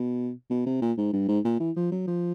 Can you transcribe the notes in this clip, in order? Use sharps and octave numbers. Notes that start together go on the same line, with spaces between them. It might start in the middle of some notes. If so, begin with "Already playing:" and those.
Already playing: B2
B2
C3
A#2
G#2
G2
G#2
A#2
E3
F3
F#3
F3